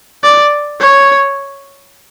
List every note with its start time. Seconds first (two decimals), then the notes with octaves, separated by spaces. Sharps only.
0.23 D5
0.81 C#5